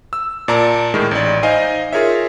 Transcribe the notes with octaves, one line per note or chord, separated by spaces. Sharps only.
E6
A#2 D5 A5 A#5 D6
A2 D#3 G#3
A1 D5
D#4 C5 D#5 F5 G#5
F4 G#4 A#4 C#5 E5